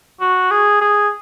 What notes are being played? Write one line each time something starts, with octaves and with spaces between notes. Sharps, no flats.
F#4
G#4
G#4